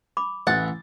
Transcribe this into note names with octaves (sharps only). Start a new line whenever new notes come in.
B5 D6
A1 F#5 A6